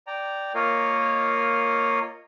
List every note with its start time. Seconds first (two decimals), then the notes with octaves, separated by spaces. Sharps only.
0.07 D5 G5 A#5
0.55 A#3 F4 A#4 C#5 D#5 F5